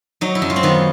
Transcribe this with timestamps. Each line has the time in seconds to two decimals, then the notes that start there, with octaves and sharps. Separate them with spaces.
0.21 F#3 D#4
0.35 E4
0.42 F#2
0.50 F4
0.56 C4
0.63 D#3 B3